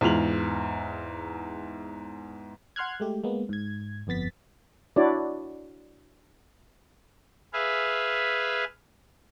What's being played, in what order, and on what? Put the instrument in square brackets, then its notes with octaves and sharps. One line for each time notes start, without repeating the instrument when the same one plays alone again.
[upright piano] E2 G#2 F4 F7 F#7
[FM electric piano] F#5 C6 F6 F#6 G#6
G#3 A3 G4
G#3 A#3 B3
G#2 G#6
G1 F2 B3 A6 B6
[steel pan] D4 E4 F#4 C#5 D5
[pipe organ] G#4 B4 E5 F5